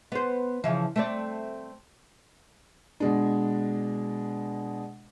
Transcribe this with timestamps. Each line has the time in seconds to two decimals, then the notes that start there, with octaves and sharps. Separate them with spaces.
0.12 B3 C5
0.64 C#3 E3 F3
0.96 A3 C4 D5
3.00 B2 G#3 D4